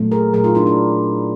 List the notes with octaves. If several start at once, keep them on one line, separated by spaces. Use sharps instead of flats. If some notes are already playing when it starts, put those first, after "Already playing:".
Already playing: A#2 F#3 A3
G#4 A#4
A#2 F#3 A3 G#4 A#4
D#4 F4
D4 E4
D4 E4